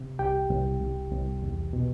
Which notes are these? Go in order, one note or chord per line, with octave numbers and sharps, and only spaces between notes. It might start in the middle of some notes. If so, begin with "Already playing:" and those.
Already playing: C3
C2 G4 G5
C2
C2
C2
E2
B2